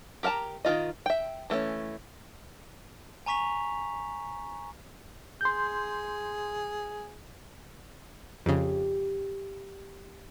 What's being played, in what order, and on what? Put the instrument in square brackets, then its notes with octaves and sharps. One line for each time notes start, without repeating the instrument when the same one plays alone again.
[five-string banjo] G4 A#4 F#5 A5 A#5
D#3 E3 F4 D#5
E5 G5
E3 A3 B3 C#4
[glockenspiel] G#5 A#5 C#6 B6 F7
[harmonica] G#4 [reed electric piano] C6 G6
[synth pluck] F2 C#3 [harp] G4